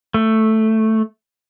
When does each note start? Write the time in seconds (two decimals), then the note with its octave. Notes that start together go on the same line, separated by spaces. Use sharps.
0.14 A3